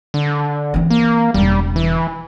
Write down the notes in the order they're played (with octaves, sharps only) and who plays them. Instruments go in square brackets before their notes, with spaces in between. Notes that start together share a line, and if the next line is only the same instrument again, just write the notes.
[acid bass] D3
[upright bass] E3 C4
[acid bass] A#3
[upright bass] E1 C#3 [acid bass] G3
[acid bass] E3